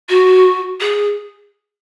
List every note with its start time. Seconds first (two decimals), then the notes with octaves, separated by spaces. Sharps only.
0.09 F#4
0.80 G#4